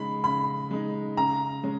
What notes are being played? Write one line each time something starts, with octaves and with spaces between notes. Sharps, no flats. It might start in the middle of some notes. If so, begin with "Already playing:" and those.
Already playing: C#3 G#3 D#4 B5
C#3 B5
G#3 D#4
C#3 A#5
G#3 C#4